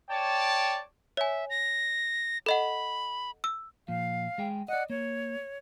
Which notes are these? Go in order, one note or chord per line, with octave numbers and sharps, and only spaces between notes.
C#5 D5 G5 A5
C#5 E5 G#5
A#6
A4 D#5 F#5 B5
E6
A#2 F3 F5
G#3 G#4 G5
D5 D#5 F#5
A#3 C#5